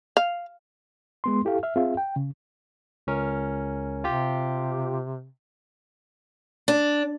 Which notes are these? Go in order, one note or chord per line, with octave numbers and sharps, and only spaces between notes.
F5
G#3 B3 C6
E4 G4 A4 F5
E5 F6
C4 F4 G#4 E5 F5
G5
C#3
C#2 C#4 A#4
C3 F4 G4
D4